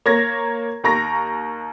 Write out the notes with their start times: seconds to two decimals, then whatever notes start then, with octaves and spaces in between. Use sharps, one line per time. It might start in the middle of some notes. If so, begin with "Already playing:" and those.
0.06 A#3 C#5 G#6 A#6
0.84 D#2 A#3 A#5 C#6 A#6